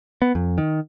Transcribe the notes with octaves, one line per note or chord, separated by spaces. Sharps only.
B3
F2
D#3